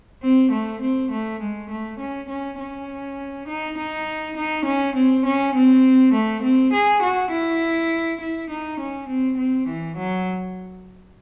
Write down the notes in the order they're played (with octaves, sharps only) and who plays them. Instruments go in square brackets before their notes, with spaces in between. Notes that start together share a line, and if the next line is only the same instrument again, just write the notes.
[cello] C4
A3
C4
A3
G#3
A3
C#4
C#4
C#4
D#4
D#4
D#4
C#4
C4
C#4
C4
A3
C4
G#4
F#4
E4
E4
D#4
C#4
C4
C4
E3
F#3